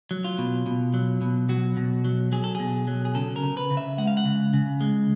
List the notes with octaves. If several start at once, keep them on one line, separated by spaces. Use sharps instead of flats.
F#3
F4
B2
B2
F#3
B2
F#3 F#4
B2
F#3
F#3 G#4
A4
B2 G#4
F#3
G#4
C#3 A4
A#4
C#3
B4
C#3
E5
G#3 F#5
F5
F#5
C#3
C#3
G#3